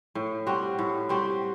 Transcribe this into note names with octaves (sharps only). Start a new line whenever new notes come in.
A2
G3 C4 F#4
A2
G3 C4 F#4